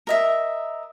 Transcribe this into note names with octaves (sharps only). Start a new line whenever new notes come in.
A#4 D#5 E5